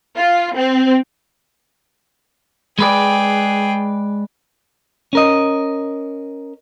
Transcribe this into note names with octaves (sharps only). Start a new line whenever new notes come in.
F4
C4
G#3 G#4 B4 D5 G5
C#4 A#4 D#5